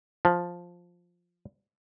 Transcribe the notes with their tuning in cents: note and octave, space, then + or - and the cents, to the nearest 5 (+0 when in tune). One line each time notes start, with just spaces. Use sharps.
F3 +5